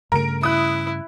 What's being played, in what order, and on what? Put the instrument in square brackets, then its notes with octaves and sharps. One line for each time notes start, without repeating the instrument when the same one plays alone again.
[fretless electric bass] G2 C#3 A3 [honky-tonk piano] A#4 D7
[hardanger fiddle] E4 [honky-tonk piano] D#6 F#6